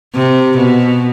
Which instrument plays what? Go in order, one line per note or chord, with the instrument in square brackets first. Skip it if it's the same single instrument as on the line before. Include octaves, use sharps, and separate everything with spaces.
[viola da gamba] C3
B2